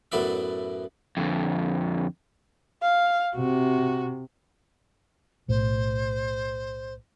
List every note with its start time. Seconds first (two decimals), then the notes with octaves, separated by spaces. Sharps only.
0.12 F#2 A2 B3 D5 E5
1.17 F2 D3
2.82 F5
3.35 C3 F#4
5.48 B1 A2 C5